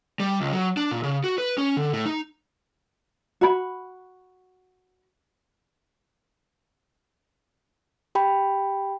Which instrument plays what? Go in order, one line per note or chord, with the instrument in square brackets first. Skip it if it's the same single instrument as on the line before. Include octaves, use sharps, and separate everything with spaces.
[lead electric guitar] G3
C#2
F#3
D4
A#2
C#3
F#4
B4
C#4
D3
A2
D#4
[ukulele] F#4 B5
[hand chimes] G4 G5 B5